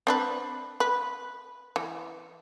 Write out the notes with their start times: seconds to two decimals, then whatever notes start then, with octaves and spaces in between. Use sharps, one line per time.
0.07 C4 D4 B4
0.80 B4
1.76 E3